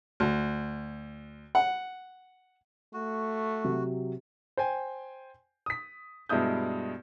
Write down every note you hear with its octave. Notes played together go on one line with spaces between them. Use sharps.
D2
F#5
A3 F#4
C3 F#3
C5 G5 G#5
D#6 B6
G2 B2 G#3 E4 D#6 G6